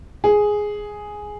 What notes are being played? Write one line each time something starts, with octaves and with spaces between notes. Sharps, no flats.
G#4